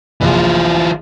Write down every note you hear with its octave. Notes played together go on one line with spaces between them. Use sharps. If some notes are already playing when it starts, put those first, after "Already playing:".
F1 A#1 E3 F4